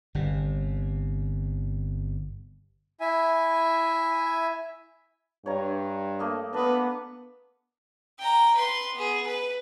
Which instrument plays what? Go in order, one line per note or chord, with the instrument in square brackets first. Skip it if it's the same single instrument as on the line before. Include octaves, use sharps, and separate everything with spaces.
[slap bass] G1 C3
[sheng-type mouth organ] E4 E5 G#5
[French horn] G2 [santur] C#5 A#5
[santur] A3 A#3 D#5
[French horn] B3 [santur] D4 D#5 [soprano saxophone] B4
[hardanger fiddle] G5 A#5
B4 C6
B3 G#4
B4